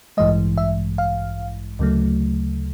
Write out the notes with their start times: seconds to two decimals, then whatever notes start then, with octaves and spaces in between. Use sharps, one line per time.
0.17 A1 G2 E3 G#3 D#5
0.58 E5
0.98 F5
1.79 D2 C#3 F#3 A3